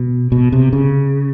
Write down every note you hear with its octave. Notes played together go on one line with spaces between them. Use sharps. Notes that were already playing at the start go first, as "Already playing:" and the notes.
Already playing: B2
B2
C3
C#3